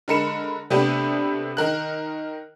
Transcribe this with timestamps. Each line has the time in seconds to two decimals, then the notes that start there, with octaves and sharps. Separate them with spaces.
0.08 D3 G#3 A#4 B5 C#7 E7
0.70 C3 A3 B3 D4 G4
1.57 D#3 A#4 F#6